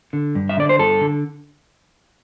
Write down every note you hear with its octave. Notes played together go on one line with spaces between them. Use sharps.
D3
G2
E5
D3 D5
C5
G2 A4
D3